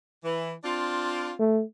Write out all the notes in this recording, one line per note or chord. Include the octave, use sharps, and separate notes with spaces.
E3
C4 D4 F4
A3